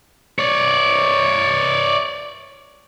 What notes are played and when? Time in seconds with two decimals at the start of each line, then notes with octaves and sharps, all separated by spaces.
0.39 C#5 D5